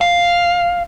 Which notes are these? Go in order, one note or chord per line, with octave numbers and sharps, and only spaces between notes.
F5